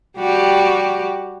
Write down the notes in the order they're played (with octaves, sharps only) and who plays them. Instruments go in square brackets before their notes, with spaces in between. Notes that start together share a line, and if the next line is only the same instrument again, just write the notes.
[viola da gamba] G3 F#4 G4